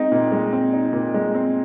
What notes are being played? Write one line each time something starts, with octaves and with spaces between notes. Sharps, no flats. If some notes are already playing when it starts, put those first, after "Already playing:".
Already playing: G#3 C4 D#4
A#2
G#3
C4
D#4
A#2
G#3
C4